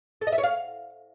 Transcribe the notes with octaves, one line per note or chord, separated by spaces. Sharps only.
A4
D#5
E5
C#5
F5